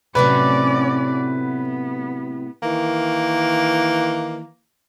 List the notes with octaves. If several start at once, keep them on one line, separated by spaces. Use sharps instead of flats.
A2 C3 F#3 C#4 B4 D5
B3
D#3 E3 A#3